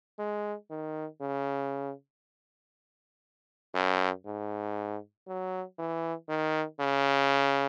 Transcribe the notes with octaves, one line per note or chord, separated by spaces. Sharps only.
G#3
D#3
C#3
F#2
G#2
F#3
E3
D#3
C#3